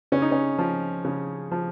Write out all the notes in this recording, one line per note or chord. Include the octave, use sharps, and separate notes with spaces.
C#3 C#4
D#4
C#4
F3
C#3
F3